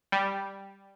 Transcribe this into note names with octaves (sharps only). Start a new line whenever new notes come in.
G3